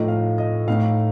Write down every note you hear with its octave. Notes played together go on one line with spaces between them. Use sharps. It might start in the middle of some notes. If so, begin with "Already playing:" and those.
Already playing: A2 F3 A3 D#4 D#5
F5
D#5
A2 A3 D#4 F5